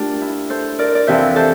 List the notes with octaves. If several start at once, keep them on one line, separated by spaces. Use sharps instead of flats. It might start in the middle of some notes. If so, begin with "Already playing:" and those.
Already playing: A3 D4 F4 G4 A#4
E4
A4 C5
A#4 D5
D5
F2 C3 E3 C5 E5
A4 C5